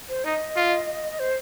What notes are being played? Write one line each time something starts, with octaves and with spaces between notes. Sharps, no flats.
C5
D#4 D#5
F4
C5